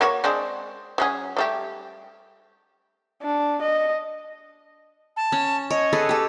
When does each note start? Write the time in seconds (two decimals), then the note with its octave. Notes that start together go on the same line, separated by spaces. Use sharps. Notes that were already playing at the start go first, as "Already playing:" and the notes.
0.01 A#3 F#4 C#5
0.24 G#3 C4 D4
0.98 F#3 C#4 G#4
1.37 G3 A3 G4
3.22 D4
3.62 D#5
5.17 A5
5.32 C#4
5.70 C#5 D#5
5.93 G#4 A4 B4
6.09 G4 A4